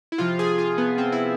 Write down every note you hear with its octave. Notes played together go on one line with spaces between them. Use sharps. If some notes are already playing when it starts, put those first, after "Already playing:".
E4
C3 F3 F4
G#4
F4
B3
C4
E4